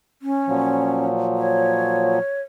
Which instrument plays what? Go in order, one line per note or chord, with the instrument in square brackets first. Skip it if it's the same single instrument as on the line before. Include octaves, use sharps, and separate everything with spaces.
[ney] C#4
[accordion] A#2 F3 F#3
[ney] C#5